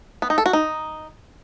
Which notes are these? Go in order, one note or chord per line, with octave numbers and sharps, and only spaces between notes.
B3
D#4
A4
F#4
D#4